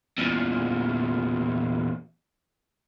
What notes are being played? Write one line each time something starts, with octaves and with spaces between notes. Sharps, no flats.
E2 A#2